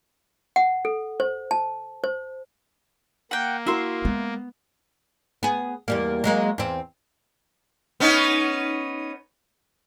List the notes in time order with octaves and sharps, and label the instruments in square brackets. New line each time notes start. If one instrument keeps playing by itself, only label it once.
[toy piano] F#5
A4
C5
A5
C5
[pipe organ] A#3 [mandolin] F#5 G5
[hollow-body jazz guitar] E4 F#4 A#4 [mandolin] E5 C6
[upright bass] G#3 [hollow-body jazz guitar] B3
[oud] B3 G#4
E2 G3 A#3
F#3 G#3 A#3
E2 C4
[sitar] B3 C#4 D#4